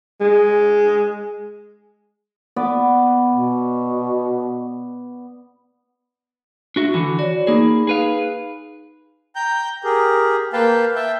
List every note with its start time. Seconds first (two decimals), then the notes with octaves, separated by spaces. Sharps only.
0.21 G#3
2.56 B3 B4 D5
3.31 B2
6.76 D4 F#4 E5
6.94 D3 E3 F#4 B5
7.19 F#4 C#5 D5
7.47 A#3 D#4 G#4 B5
7.87 G#4 B4 F5
9.36 G5 A#5 G6
9.84 G4 G#4 A#4
10.53 A#3 B4 F5 G5 A5
10.95 E5 G5 A5